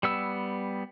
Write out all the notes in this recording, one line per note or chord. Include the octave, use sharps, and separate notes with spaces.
G3 B3 E6